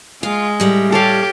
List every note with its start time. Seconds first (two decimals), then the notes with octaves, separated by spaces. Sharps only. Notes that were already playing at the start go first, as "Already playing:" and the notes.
0.23 G#3 F4 F5
0.60 A2 G3
0.92 G4 A4 C#5 F5